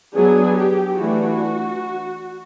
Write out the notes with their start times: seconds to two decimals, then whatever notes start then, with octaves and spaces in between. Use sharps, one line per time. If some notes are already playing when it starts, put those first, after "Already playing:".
0.14 F#3 B3 D4 G#4
0.56 G4
0.98 E3 A3 D4 F#4